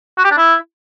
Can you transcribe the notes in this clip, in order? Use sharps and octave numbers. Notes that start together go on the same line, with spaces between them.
F#4
G4
D4
E4